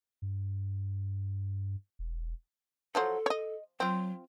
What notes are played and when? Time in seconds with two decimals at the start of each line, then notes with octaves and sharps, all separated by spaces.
0.22 G2
1.99 E1
2.95 F3 F#3 A4 C5
3.26 C#5 D#5
3.80 F#3 C4 F4